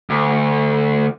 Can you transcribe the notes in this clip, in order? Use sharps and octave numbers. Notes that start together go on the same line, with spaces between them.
D2